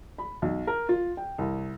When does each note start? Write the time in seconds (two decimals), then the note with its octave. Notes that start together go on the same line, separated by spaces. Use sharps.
0.18 B5
0.42 B1
0.67 A#4
0.89 F4
1.17 G5
1.38 C2